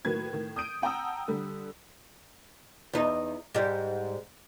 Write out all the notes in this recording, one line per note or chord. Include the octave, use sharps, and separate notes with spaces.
A2 D#3 F#3 A#3 B4 G#6
A2 D#3
D#6 G6 D7 D#7
F#5 G5 A5 A#5 D#6 E6
D3 G3
E2 D#4
G#2 G3